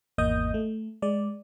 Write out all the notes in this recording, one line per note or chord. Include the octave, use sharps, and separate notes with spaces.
G#1 E2 A#3 D#5 D#6 G6
A3
G#3 D5